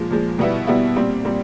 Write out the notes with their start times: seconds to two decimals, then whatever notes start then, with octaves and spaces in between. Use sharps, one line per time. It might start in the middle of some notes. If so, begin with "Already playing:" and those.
Already playing: A#2 F3 G#3
0.10 A#2 F3 G#3
0.39 B2 G3 B3 E4
0.67 B2 G3 B3 E4
0.96 A#2 G3 C4
1.25 A#2 G3 C4